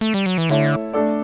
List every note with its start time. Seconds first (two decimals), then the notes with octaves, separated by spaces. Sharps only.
0.01 A3
0.14 G3
0.26 F#3
0.38 E3
0.49 D3 A3 E4 A4 C#5 E5
0.93 A3 D4 A4 D5